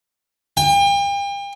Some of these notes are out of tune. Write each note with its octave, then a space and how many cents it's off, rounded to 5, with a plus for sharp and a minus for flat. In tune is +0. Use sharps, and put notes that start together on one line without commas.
G5 +40